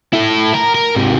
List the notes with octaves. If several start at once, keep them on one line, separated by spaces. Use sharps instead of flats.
E4 A4
A#4
A#4
G#2 C3